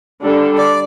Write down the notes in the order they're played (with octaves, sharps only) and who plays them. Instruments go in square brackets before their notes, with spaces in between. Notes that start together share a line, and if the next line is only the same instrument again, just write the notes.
[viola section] D3 G3 D4 A4
[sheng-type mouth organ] D5